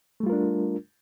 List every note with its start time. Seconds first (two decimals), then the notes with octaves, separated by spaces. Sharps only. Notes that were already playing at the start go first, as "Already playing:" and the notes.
0.20 A3
0.23 G3
0.26 F4
0.30 A#4
0.33 D4